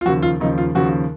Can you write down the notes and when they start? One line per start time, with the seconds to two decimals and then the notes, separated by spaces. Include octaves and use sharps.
0.01 F4
0.05 D#2 C#3 F3 F#4
0.22 F4
0.40 D#2 C#3 F3 D#4
0.58 F4
0.75 D#2 C#3 F3 F#4